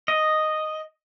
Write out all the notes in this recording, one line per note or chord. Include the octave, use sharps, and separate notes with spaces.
D#5